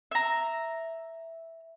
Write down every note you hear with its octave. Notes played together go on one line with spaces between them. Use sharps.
E5 A#5